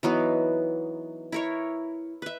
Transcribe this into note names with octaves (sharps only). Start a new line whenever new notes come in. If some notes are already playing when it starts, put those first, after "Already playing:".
E3 F#3 B3 D#4
E4 A#4 C#5
B4 E5